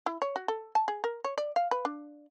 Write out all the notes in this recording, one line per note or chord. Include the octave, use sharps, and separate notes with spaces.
E4
C#5
F#4
A4
A5
G#4
A#4
C#5
D5
F5
B4
D4